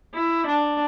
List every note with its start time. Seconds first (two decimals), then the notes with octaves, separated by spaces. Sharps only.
0.15 E4
0.47 D4